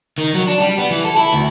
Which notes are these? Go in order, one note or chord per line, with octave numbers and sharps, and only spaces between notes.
D#3
F#3
D4
G3
B3
E3
A4
E4
D2